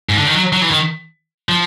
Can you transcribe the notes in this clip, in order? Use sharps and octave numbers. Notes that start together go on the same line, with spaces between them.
G#2
D3
D#3
F#3
F#3
E3
D#3
F3